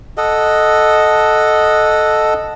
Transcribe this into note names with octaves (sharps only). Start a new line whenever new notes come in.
A4 D#5 F#5